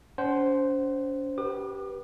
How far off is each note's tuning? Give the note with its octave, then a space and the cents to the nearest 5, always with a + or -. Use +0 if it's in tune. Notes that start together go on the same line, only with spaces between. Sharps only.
C#4 +40 C5 +0 F#5 +30
G4 -10 B4 -25 D6 +45